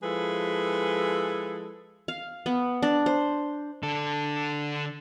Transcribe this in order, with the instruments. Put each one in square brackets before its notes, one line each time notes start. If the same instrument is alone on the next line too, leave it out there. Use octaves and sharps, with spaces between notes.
[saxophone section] F3 G#3 E4 G#4 A4 B4
[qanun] F5
B3
D4
C5
[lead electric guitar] D3 A4